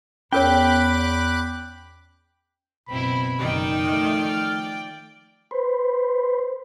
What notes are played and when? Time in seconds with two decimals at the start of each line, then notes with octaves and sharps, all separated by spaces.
0.33 E2 C#4 A#4 C#5 G5 B5 D6 F#6
2.89 F#1 B2 C4 E4 B5
3.39 F#1 D#3 D#4 D5 G5
3.87 F3 A3 F6
5.51 B4 C5